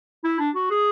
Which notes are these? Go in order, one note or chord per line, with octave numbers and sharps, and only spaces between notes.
E4
D4
F#4
G#4